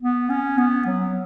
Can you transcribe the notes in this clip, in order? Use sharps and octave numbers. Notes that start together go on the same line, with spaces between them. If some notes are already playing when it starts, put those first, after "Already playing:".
B3
C#4
B3
F#3